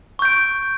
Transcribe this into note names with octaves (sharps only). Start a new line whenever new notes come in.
C#6 G6 D7